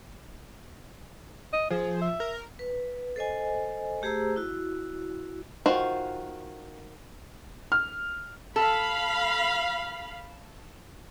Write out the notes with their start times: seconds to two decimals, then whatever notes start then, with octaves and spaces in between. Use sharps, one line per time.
1.53 D#5
1.70 F3 G#4
2.02 E5
2.20 A#4
2.59 B4
3.16 A4 C5 D#5 G#5
4.02 A3 G4 G#4 C5 A#5 E6
4.36 E4 F#4
5.66 D#3 F4 F#4 C5
7.72 F6
8.56 A4 F5 B5